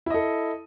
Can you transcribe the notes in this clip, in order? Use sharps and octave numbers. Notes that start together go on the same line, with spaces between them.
E4 A4 D#5